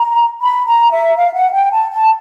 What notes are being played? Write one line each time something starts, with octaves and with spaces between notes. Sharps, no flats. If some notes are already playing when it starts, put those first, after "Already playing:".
Already playing: A#5
B5
A#5
E5
F5
F#5
G5
A5
A5